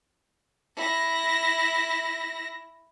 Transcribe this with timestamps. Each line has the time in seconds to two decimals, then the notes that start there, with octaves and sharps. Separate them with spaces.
0.76 E4 A#6